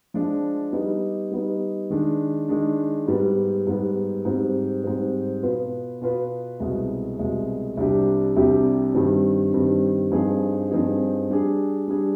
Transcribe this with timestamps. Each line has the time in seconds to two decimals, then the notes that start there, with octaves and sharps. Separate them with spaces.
0.14 F3 G#3 D4
0.72 G3 B3 D#4
1.32 G3 B3 D#4
1.90 D#3 G#3 D4
2.49 D#3 G#3 D4
3.08 G#2 G3 B3
3.67 G#2 G3 B3
4.25 G#2 G3 C4
4.84 G#2 G3 C4
5.43 B2 B3 F4 B4
6.01 B2 B3 F4 B4
6.60 C2 B2 G#3
7.19 C2 B2 G#3
7.77 C2 C3 G3 D4 G4
8.36 C2 C3 G3 D4 G4
8.95 G2 D#3 G3 C4
9.54 G2 D#3 G3 C4
10.12 G2 F3 C4 D#4 G#4
10.71 G2 F3 C4 D#4 G#4
11.30 G3 D4 G#4
11.88 G3 D4 G#4